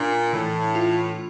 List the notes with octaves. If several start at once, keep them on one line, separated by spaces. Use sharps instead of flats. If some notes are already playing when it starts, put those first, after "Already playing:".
Already playing: A#2 D4
A2 E3
F4